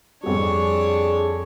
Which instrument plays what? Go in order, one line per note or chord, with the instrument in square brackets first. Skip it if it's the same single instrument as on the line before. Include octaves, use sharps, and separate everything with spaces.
[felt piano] F2 G3 [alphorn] D4 [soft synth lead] G#4 [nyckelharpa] C#5